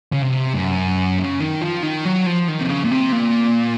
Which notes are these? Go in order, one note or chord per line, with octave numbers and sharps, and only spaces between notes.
C#3
C3
F#2
C#3
D#3
F3
D#3
F#3
F3
D#3
C3
C#3
A#2
C3
A#2